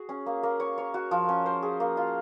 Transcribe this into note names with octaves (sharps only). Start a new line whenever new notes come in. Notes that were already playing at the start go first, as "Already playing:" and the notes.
Already playing: F#4 G#4
C#4
A#3
A#3
C#5
C#5
F#4
F3
C#4
C5
G#4
A#3
F4